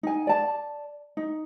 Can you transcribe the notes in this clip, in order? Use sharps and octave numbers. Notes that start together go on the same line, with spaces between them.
D#4 G#5
D5 A5
D#4